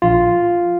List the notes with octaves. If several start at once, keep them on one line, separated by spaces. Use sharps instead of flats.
A#1 F4